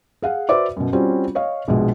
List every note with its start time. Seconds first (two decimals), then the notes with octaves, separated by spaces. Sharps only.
0.22 G#4 F5 F#5
0.49 F#4 B4 C5 D5 E5 D6
0.77 F#2 B2
0.93 G3 C4 C#4 F4 F#4
1.35 C#5 D#5 F5
1.68 A#1 B2 G#3